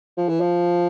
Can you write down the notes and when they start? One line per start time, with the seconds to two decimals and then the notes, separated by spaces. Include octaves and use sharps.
0.17 F3
0.28 E3
0.40 F3